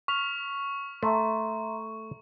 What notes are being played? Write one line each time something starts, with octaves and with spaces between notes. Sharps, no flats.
C#6 F6 B6 F7
A3 E5 A#5 C6